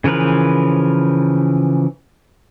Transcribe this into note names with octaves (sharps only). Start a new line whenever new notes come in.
C#3 E3 F3 A#4 B4